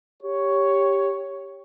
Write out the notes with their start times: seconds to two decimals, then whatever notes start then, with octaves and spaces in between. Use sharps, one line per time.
0.22 G4 C#5